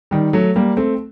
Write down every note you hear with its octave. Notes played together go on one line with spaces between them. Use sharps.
D#3 G3
F#3 A3
G3 A#3
A3 C4